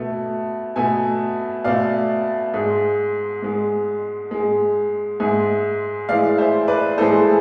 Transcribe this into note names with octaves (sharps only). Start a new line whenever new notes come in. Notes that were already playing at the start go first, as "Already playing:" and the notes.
Already playing: B2 A3
B2 A3 E5 G#5
B2 A3 D5 F5
G#2 G#3
G#2 G#3
G#2 G#3
G#2 G#3 E5 G#5
A2 E3 G#3 D5 F5
C5 E5
B4 D5
A2 E3 G#3 A4 C5